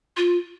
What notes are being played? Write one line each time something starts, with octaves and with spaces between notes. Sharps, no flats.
F4